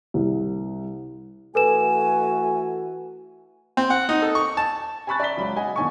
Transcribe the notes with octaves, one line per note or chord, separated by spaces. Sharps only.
C2
E3 A3 F#4 A4 B4 G#5 E7
C4
F#5
D#4
A4
C#6
A5
G#5 A5 B5 C#6 F#6 A6
D5 E5 A#5 B6 G7
C#2 F#3 B5
D#5 F#5 G#5
F#1 E2 D3 G#5 A5 C#6